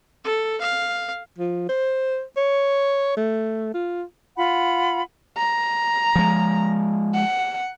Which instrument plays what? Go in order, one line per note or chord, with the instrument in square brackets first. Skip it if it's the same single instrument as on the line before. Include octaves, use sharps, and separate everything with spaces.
[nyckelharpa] A4
F5
[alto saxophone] F3
C5
C#5
A3
F4
[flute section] F4 F#5 B5
[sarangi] A#5
[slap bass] F3 G#3
[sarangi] F#5